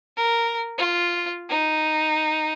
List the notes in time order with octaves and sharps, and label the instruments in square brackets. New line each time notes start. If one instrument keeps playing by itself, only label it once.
[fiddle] A#4
F4
D#4